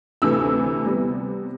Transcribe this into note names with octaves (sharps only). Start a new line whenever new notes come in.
D2 C3 E3 A3 E6
C3 G3 B3